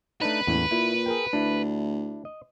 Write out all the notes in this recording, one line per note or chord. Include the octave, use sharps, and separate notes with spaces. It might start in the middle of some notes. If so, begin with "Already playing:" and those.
A3 D4 D#4 B4
F#1 E2 A2
A#2 E4
G#4 A#4 G5
D2 D4 E4
D#5